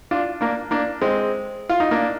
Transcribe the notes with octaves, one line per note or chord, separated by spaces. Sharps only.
D4 F4
A#3 D4
A#3 D4
G#3 C4
F4
D#4
A#3 D4